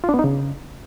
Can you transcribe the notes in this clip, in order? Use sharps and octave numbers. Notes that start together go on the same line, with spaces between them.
F4
D4
B3
D#4
C#3